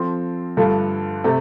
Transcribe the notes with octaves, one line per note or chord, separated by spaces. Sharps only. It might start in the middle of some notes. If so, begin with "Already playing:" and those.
Already playing: F3 C4 A4
G2 D3 A3 F4 A4
C3 A3